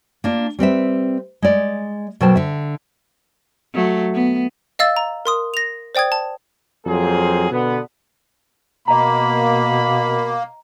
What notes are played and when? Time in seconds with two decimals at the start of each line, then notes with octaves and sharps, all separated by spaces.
0.24 A#3 D4 F4
0.59 G3 C4 B4 E5
1.42 G#3 D5
2.21 B2 F#3 A#4 C5 G5 A5
2.36 D3 E5
3.74 F#3 A3
4.14 B3
4.79 D#5 F5 E6 A6
4.97 A#5
5.25 A#4 C6 D#6
5.54 A#6 F7
5.95 C5 D5 G5 D#6 G#6
6.12 A5
6.87 F2 F#3 A#3 G#4 C5
7.52 B2 D3 B3
8.88 B2 A#3 D#5 A#5 B5